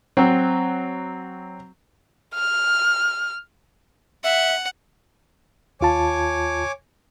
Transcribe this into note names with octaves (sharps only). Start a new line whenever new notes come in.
F#3 C4
F6
E5 F#5
D#2 F4 C#5 G#5 A5 D6